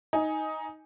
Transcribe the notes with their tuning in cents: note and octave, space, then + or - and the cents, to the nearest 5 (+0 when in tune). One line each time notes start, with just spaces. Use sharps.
D#4 +10 G#5 +0